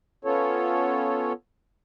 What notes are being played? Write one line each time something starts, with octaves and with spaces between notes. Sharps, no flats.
B3 C#4 F4 A4 C#5